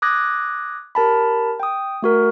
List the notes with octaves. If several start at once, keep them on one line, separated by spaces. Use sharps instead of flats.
D6 D#6 F#6 G#6 A#6
G4 A#4 A5 B5
G5 D#6
A3 F#4 A#4